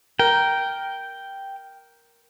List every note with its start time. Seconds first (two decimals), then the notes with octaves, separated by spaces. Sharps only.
0.19 A#4 G5